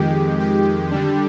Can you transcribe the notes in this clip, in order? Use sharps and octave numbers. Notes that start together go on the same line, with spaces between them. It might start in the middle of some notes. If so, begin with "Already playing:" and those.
Already playing: F2 D#3 G#3 G4
G4
D3 G3 D4